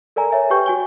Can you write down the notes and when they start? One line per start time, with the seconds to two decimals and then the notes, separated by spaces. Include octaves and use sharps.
0.16 A4 A#4 D5 G#5 A#5
0.30 C#5 E5 G#5 A#5
0.50 G4 B4 G5 C#6 G6
0.66 F#4 G#5 G7